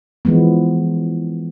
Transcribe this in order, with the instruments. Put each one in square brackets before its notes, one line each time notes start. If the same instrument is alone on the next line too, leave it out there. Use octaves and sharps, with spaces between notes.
[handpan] E3 F3 G#3 B3